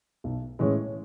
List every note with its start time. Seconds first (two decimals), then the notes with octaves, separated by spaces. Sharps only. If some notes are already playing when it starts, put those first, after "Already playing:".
0.24 B1
0.59 A2 E3 G#3 C#4